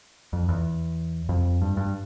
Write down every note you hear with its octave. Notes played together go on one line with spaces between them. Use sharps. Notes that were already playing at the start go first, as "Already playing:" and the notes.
F2
E2
F2
G2
G2